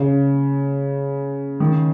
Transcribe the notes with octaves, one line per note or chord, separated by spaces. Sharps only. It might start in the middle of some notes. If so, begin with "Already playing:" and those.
Already playing: C#3
D#3